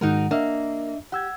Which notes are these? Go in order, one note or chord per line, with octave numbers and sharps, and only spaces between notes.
G#2 D#3 G#3 D#4 F#4 A#4
A#3 D4 D#5 E5
G4 F#5 E6 G#6